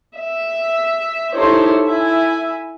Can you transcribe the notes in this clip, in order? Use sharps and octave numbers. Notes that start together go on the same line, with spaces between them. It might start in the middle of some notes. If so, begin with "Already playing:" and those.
E5
D#4 E4 G4 A4 C5 C#5
E4 E5 G#5